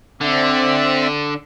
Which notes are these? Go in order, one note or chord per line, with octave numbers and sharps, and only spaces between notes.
D3 C4 D5 E5